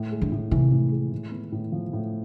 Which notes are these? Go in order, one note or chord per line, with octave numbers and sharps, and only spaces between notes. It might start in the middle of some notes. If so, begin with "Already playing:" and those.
Already playing: A2
G#3
D3
A2
C3 E3
A2
G#3
A2
B3
A2
F3
A2